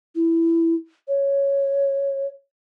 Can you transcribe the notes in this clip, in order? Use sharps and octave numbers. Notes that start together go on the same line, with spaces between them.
E4
C#5